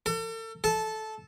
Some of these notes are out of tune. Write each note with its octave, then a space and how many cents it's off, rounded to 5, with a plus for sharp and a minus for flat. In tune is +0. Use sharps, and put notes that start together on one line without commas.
A4 +35
A4 -15